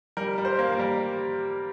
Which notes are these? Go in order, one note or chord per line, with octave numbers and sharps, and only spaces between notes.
G3 A#4
G3
C5
A#3
A#4
G3